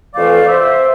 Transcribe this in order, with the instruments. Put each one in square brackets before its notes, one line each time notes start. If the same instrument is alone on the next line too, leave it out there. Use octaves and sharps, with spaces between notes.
[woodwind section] F2 E3 A3 D5 F5
C5 E5